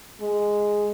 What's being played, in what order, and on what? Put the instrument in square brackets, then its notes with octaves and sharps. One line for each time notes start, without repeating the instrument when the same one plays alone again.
[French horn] G#3